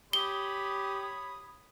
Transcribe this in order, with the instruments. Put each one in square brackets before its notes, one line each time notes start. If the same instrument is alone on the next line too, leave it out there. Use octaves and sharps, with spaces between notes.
[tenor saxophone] G4 [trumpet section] C#5 B5 [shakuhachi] D#6 [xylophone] G7